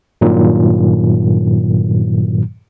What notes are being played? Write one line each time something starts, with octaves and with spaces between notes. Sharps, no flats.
G2 A#2 D#3 F#3